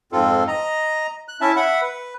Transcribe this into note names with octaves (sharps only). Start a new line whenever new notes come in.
F2 G#2 C4 F4 A4
D#5 A#5
F#6
C#4 E4 E5 A5
E5 F#5 B5
B4